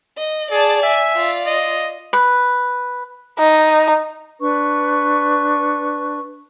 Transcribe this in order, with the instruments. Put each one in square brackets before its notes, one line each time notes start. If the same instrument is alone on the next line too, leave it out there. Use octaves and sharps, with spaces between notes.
[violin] D#5
[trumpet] G#4 [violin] D5 A5
[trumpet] E5 [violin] G#5
[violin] F4 D5
[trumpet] D#5
[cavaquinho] B4
[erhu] D#4
[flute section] D4 B4 C#6